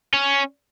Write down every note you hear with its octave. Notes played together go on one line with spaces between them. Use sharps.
C#4